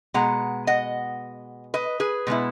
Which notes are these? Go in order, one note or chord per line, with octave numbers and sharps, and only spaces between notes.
B2 G#3 B3 F#5 A#5
D#5 F#5
B4 D#5
G#4 B4
B2 G#3 B3 E4